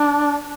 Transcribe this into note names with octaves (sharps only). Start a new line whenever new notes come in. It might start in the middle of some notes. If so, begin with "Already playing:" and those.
Already playing: D4